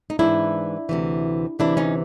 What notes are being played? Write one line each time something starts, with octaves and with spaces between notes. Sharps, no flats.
D#4
G#2 E3 D4 E4
D2 C3 E3
D2 C3 E3 D4 E4
C#4 D#4